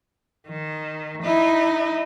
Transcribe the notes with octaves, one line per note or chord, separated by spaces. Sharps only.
D#3
D#4 E4